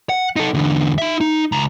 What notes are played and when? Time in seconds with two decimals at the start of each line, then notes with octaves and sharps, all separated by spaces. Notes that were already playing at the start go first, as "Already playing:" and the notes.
0.09 F#5
0.36 D#4 A4
0.54 E2 D3
0.98 D#4 E5
1.21 D#4
1.52 C#2 A#5